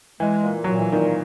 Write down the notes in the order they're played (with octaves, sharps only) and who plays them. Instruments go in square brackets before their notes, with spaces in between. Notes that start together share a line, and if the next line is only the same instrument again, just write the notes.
[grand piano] E3 [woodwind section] G#3
[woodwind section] A#2
[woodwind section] A#2 [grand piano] F#3
[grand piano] E3
[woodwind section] A#2 [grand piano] D#3